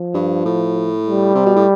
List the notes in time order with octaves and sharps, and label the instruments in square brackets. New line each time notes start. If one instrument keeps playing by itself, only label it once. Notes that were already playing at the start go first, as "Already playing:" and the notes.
Already playing: [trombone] F3
[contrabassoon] G2
A2
[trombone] G3
[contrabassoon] C3
B2
A2